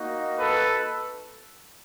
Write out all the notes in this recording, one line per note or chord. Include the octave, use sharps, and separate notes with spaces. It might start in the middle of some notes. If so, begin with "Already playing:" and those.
Already playing: A#3 D#4 F#4
A4 B4